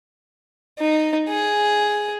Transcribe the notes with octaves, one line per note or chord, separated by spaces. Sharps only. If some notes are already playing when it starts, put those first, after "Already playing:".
D#4
G#4